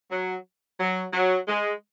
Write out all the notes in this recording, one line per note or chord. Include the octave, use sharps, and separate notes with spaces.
F#3
F#3
F#3
G#3